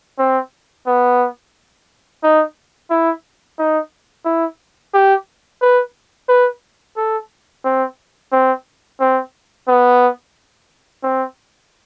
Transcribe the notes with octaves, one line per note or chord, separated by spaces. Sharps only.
C4
B3
D#4
E4
D#4
E4
G4
B4
B4
A4
C4
C4
C4
B3
C4